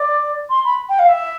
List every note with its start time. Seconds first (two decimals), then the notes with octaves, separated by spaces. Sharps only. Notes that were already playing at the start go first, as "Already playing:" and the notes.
Already playing: D5
0.50 C6
0.64 B5
0.89 G5
0.99 F5
1.08 E5